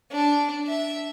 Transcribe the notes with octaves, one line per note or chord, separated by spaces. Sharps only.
D4
E5